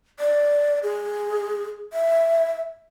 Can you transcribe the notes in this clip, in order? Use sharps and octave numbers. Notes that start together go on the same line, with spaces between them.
D5
G#4
E5